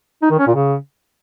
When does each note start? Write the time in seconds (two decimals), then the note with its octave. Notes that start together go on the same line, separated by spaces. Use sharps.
0.22 D#4
0.30 D#3
0.39 C#4
0.47 A#2
0.55 C#3